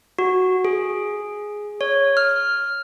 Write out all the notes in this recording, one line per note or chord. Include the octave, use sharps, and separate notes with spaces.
F#4
G#4
C#5
F6